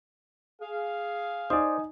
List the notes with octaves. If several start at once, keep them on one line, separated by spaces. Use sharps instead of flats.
G#4 F5
D#4 C5 D5 G#5 D#6